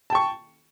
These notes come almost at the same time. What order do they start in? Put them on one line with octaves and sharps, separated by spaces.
A5 G5 C#6